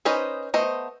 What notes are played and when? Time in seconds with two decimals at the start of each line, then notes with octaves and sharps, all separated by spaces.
0.05 C#4 D#4 B4 C5 D#5
0.54 A3 B3 C5 D#5